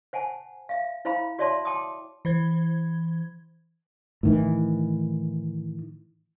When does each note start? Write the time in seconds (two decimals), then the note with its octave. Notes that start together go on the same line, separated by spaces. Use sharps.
0.13 C5 F#5 G#5 A5
0.69 E5 F5
1.05 E4 C5 F5 A#5 B5
1.39 F#4 C#5 D5 E5 A5 C6
1.65 G5 A5 C6 D6 D#6
2.25 E3 C5 G#6
4.23 A2 D#3 E3